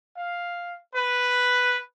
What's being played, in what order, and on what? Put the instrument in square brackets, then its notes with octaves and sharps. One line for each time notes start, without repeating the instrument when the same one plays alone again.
[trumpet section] F5
B4